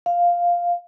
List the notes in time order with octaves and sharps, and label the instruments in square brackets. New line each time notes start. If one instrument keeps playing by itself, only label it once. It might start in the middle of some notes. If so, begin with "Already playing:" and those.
[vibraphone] F5